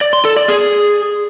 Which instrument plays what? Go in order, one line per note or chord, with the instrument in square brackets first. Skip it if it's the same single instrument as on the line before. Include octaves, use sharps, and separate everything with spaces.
[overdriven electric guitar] D5
C6
A4
D5
G#4